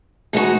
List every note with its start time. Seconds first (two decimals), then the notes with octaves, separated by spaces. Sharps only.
0.33 B2 G#3 D#4 F#4